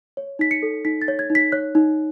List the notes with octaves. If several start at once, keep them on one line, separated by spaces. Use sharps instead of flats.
C#5
D#4 B6
C#7
A4
D#4 B6
A6
C#5
G#6
D#4
B6
C#5 F#6
D#4